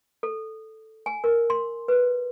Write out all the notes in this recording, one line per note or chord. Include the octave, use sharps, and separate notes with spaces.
A4
G#5
A#4
C6
B4